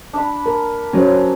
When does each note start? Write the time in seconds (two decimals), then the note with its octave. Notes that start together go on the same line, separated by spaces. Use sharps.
0.13 D4 B5
0.46 A#4
0.93 F#3 C#4 F#4 C5